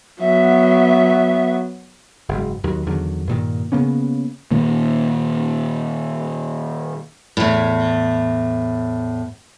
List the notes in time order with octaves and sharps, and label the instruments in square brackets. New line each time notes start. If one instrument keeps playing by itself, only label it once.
[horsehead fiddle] F#3 B3 [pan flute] E5
[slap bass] F#1 G#2
D#2 D#3 F#3
E2 D3 D#3 F#3
G2 A#2 D#3
C#3 A#3 B3 C#4
[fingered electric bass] A#2 D#3 A#3
[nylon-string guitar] E2 A2